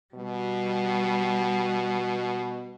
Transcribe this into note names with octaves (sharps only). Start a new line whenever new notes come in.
B2 G3